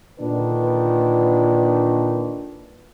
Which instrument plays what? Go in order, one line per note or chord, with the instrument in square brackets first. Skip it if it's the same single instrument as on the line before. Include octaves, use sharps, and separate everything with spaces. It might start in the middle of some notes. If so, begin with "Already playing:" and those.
[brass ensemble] A#2 D3 D#3 D4 B4